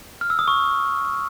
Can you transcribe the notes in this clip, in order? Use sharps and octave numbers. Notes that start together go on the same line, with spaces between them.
F6
E6
D#6
C#6